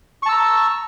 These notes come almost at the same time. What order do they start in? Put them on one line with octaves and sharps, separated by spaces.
C#6 A5 E6 A#5